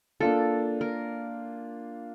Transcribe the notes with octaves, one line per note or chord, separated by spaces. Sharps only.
A#3 D4 F4 A4
A#4